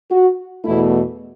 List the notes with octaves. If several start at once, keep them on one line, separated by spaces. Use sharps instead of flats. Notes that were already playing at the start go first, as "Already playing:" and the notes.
F#4
E2 B2 A3 E4